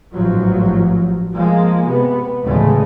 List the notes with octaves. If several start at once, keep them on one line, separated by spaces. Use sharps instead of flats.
A1 G#2 F3 F#3
F3 G#3 A#3
C3 B3
D2 A2 C#3 E3 G#3 A3